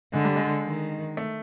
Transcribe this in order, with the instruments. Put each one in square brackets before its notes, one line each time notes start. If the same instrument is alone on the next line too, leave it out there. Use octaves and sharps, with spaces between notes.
[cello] D3 [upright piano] G#3
[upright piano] G3
G#3
[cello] D#3
[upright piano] A3